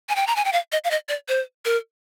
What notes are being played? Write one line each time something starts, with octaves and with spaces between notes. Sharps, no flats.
G#5
G5
A#5
G#5
G5
F5
D#5
F5
D#5
D5
C5
A#4